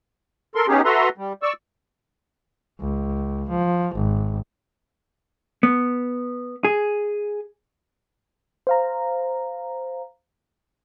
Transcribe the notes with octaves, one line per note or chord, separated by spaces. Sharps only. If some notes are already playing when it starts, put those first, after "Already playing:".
A4 A#4 C6
B3 C#4 D#4 G4 G#4
F#4 A4 B4 E5 A#5 C6
G3
D5 C#6 E6
C#2
F3
G#1
B3
G#4
C5 F5 A#5